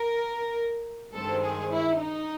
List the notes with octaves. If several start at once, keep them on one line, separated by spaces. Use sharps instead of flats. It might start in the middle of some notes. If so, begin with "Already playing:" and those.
Already playing: A#4
G2 D#3 G#3 C4 A4
G#4
E4
D#4